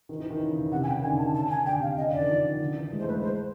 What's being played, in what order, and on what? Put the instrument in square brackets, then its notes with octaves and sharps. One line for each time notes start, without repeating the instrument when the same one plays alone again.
[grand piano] D#3
E3
D#3
C#3
C#3
[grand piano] C3 [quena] F#5
[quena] G#5
[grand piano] C#3 [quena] G5
[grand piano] D#3
[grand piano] D3 [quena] G#5
[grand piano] D#3 [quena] A5
[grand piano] C#3 [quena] A5
[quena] G#5
[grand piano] D3 [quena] G5
[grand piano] C3
[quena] F5
[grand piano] C#3 [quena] D#5
[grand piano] D3
[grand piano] D#3 [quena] D5
[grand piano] F3
D#3
D3
E3
G#3
[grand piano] A3 [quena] C5
[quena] B4
[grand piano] G#3
[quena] C5